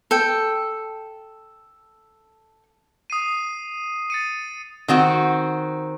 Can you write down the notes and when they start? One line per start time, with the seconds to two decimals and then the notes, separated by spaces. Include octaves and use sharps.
0.11 A4 G5
3.10 D#6 C7 D#7
4.10 A6 C#7 D#7
4.88 D#3 C4 F#4